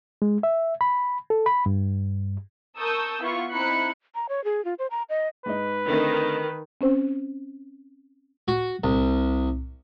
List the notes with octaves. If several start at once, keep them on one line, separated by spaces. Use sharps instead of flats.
G#3
E5
B5
A4
B5
G2
A#4 A5 C#6 D#6 E6 G6
B3 E4 F4 C#6
C4 D#4 E4 B5 F#6 C#7
A#5
C#5
G#4
F4
C5
A#5
D#5
G#2 D#4 B4
D3 D#3 A3 C4
C4 C#4 C5
F#4
C2